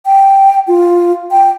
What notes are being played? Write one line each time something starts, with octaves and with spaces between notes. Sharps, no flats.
G5
F4
G5